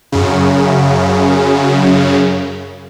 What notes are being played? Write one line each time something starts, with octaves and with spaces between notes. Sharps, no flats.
F#2 C#3